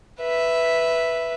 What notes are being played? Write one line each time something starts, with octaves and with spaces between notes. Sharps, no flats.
B4 E5